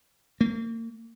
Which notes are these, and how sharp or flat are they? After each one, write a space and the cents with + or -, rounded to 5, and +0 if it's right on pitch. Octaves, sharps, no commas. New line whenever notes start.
A#3 -35